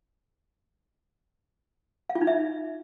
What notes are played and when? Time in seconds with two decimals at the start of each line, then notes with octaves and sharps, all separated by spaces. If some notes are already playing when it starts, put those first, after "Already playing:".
2.09 F5
2.15 F4
2.21 D#4
2.27 E5